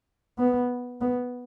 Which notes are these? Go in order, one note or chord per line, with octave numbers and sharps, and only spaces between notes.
B3
B3